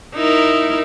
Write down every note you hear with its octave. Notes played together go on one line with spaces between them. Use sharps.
D#4 E4 A#4